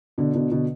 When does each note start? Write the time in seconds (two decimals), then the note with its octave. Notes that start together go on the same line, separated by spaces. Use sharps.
0.18 B2 D3
0.34 B2 D3
0.52 B2 D3